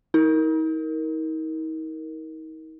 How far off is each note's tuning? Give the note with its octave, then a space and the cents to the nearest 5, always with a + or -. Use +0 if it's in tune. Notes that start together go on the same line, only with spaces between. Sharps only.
D#4 +40 A#4 +0